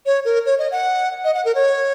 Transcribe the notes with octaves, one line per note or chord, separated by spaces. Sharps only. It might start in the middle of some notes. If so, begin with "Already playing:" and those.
C#5
A#4
C#5
D#5
F#5
D#5
F#5
A#4
C#5